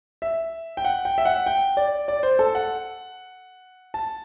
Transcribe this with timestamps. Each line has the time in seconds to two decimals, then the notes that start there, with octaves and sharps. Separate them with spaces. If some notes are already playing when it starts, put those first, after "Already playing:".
0.22 E5
0.77 G5
0.85 F#5
1.05 G5
1.18 E5
1.25 F#5
1.46 G5
1.77 D5
2.08 D5
2.23 C5
2.39 A4
2.55 F#5
3.94 A5